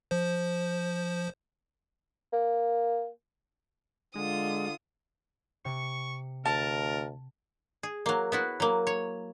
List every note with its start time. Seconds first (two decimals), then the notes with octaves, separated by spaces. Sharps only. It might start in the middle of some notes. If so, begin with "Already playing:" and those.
0.11 F3 C5
2.33 A#3
4.16 D3 G#3 F4 D#6
5.65 C3 C#6 C#7
6.45 D2 A#4 A5
7.83 G#4
8.06 F#3 A#3
8.32 B3 E4 F#4
8.60 F#3 A#3
8.87 C#5